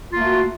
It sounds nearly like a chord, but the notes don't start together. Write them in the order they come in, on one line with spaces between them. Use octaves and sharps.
F4 A#3 A3 F#4